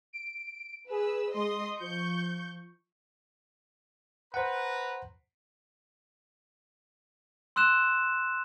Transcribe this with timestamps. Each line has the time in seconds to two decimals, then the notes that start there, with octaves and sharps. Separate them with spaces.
0.13 D7
0.90 G#4 B4 E6
1.34 G#3 D#5 C6 D#6
1.80 F3 C#6 G6
4.34 B4 C5 F#5 A#5
7.56 C6 E6 F#6 E7